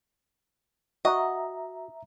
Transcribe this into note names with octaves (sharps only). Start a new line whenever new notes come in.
F#4 D#5 E5 A#5